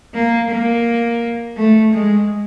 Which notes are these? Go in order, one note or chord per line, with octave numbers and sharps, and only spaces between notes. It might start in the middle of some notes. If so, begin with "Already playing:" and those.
A#3
A#3
A3
G#3